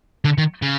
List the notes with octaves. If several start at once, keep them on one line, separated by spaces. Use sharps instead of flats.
D3
D#3
C#3